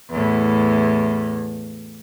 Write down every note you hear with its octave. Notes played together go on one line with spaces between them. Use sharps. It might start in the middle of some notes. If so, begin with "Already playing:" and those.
E2 A2